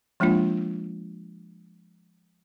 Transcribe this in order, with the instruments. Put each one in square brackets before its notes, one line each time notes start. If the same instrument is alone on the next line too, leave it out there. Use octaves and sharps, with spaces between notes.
[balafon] F3 G#3 A#3 D4 F4